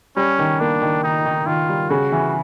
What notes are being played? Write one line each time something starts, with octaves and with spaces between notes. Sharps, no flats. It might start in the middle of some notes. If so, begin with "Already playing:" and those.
G3 C#4
D#3
A#3 D4
D#3
D#3 D#4
D#3
D#3 F4
G3
C#3 F#4
E3